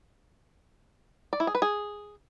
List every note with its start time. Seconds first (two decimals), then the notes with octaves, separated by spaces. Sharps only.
1.33 D5
1.40 E4
1.47 G#4
1.55 B4
1.62 G#4